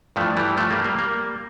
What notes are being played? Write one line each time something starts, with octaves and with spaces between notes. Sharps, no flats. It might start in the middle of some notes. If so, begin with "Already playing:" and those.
G2 E3 F3 A3
E3 G3
F3 A3
G3 A#3
G3 A#3
G3 A#3